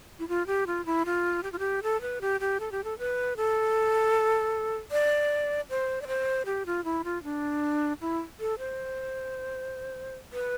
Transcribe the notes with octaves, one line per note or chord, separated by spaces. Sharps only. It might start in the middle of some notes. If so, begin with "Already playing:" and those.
E4
F4
G4
F4
E4
F4
G4
F4
G4
A4
B4
G4
G4
A4
G4
A4
B4
A4
D5
C5
D5
C5
G4
F4
E4
F4
D4
E4
A4
C5
B4